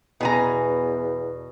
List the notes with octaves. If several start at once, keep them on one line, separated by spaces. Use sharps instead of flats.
E2 B2 G#5 A#5